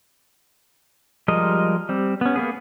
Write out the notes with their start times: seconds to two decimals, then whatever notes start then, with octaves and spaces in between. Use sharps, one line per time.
1.28 F3 G3 G#3 A#4 D#5
1.89 G3 C4
2.21 B3 C#4
2.36 A#3 B3 G#4